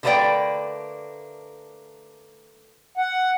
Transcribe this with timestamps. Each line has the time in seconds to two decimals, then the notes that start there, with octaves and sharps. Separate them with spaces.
0.03 D3 A3 A#3 B4 D5 G5
2.98 F#5